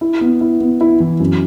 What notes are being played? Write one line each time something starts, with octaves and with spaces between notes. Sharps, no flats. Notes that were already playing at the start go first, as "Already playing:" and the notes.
E4
B3
E4
B3
E4
E3
F#2